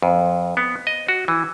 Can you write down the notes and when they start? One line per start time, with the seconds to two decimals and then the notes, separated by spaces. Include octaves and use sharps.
0.02 F2
0.57 B3
0.87 D#5
1.08 F#4
1.28 E3